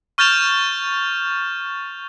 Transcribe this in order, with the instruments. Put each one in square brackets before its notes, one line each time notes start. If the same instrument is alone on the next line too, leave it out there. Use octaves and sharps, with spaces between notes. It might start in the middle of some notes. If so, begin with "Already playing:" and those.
[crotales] C#6 F6 G6 A6 E7 F7